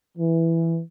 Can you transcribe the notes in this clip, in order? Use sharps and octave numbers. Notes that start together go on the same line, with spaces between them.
E3